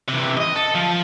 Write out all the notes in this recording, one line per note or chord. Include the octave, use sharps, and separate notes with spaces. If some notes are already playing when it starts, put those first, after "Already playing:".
C3 E3
D#5
A4
F3